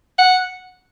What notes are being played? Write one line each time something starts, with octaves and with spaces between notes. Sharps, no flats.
F#5